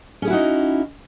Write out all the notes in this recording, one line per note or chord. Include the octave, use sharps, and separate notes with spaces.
C#4 D#4 E4 F#4 G#4